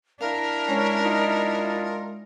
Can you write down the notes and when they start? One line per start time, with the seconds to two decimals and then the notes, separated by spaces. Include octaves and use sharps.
0.21 D4 E4 A#4 F5
0.68 G#3 C#4
1.03 D#4 F4